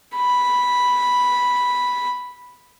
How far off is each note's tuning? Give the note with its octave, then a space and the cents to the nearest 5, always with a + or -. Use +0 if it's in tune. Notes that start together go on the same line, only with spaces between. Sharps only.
B5 -5